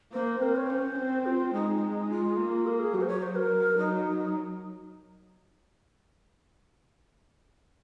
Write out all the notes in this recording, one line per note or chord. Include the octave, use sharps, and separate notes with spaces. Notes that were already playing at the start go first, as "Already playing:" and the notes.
A#3 C5
C4 A#4
C#5
C#4 C5
C4
F4
G#3 D#4
G#3
F4
A#3
A#4
G#4
F#3 F#4
C5
C#5
C5
A#4
F#3 D#4